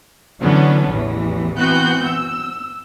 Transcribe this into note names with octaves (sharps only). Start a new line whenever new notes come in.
D3 E3 F#3 B3 C#4 D4
A1 E2 E3
E3 B3 C4 F#4 F#6 G6
E6